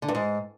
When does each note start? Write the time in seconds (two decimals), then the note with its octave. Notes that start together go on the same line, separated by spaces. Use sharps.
0.02 D3
0.08 G2
0.15 G#2